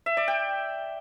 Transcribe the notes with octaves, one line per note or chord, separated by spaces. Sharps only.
E5
D5
G5